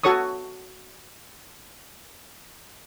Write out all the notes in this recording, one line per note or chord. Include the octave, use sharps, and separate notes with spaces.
F#4 A4 C#5 C#6 D#6